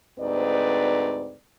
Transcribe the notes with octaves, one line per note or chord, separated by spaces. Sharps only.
D2 G#2 C4 D#4 B4 D5